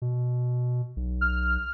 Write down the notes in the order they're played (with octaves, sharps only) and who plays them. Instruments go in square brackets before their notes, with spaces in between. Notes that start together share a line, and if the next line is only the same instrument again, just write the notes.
[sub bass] B2
B1
[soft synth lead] F6